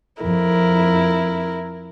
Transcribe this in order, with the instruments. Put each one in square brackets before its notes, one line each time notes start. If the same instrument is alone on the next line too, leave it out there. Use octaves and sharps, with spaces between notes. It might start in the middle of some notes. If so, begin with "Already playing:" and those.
[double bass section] F2 [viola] E4 A#4